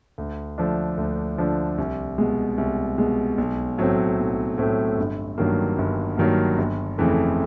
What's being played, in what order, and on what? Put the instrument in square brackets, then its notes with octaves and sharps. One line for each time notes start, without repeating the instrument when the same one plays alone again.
[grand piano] D2
D3 F3 A3 D4
D2
D3 F3 A3 D4
C2
B2 G#3
C2
B2 G#3
B1
A2 F#3 A3 C4
B1
A2 F#3 A3 C4
G1
G2 D#3 F#3 A#3
G1
G2 D#3 F#3 A#3
G1
F2 C#3 E3 A3